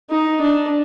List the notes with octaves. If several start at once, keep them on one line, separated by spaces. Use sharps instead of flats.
D#4
D4